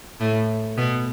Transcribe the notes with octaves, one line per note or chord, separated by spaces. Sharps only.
A2 A3
B2 B3